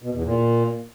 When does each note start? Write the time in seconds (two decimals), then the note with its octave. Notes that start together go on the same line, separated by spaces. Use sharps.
0.02 B2
0.13 E2
0.24 A#2